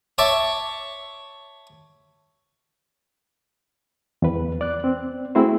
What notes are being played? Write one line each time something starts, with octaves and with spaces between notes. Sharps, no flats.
C#5 E5 A5 C#6 D6
E2 B4
D5 F#6
C4
A3 C4 E4 F#4 G#4 C5